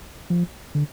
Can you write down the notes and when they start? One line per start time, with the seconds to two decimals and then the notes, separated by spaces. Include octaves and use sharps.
0.30 F3
0.75 D3